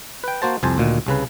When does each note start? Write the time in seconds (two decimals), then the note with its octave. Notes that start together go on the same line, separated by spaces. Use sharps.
0.24 B4 G5
0.42 A#3 F#4 C5 A5
0.63 C2 F2 C5 G#5 A5
0.78 D2 A#2 D#3
1.07 C2 C#3 B4